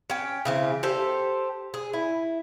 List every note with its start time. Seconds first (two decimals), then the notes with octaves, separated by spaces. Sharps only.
0.10 C#4 G5
0.45 C#3 E3 C4
0.83 G4 A4 C5
1.74 G#4
1.93 E4